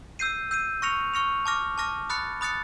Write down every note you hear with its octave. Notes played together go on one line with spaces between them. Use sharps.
E6 G6 C7 D#7
E6 G6 C7 D#7
C#6 F6 A#6 C#7 F7
C#6 F6 A#6 C#7 F7
A5 D6 F6 A#6
A5 D6 F6 A#6
B5 D#6 F#6 A6 C#7
B5 D#6 F#6 A6 C#7